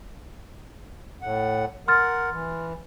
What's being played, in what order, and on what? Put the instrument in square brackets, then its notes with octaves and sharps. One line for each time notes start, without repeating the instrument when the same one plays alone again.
[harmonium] A2 F#5
[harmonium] A#4 F#5 [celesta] C6 F6 A6
[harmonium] E3